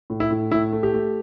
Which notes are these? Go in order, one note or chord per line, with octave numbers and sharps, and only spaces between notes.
A2
E4
A2
A2 E4
A3
G4
A3